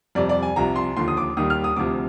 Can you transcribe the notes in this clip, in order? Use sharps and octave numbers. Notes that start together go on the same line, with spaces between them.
F2 C3 G3 D5
D5
G#5
C2 C3 F3 A#5
C6
D#2 D3 F3 C6
D#6
D6
D#2 D#3 G3 D#6
F6
D#6
D2 C3 F3 D6